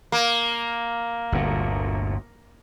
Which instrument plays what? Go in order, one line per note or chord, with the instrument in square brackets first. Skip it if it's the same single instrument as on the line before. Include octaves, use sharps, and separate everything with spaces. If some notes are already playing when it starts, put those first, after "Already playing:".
[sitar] A#3
[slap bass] G1 D2 A#2